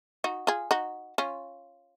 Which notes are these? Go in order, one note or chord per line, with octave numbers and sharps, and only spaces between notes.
D#4 F#4
F4 G#4
D#4 F#4
C#4 F4